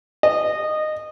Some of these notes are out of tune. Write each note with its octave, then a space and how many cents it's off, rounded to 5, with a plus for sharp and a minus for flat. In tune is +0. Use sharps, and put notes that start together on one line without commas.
D#5 -15